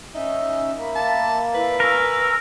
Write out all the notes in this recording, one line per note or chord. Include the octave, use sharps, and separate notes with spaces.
C#4 D#4 E5
A#3 E5 B5
A5
E4 B4 D5 F5
A#4 G#5 C#6 E6